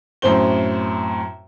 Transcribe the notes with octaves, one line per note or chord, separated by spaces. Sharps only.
F#2 A2 C4 C5 G7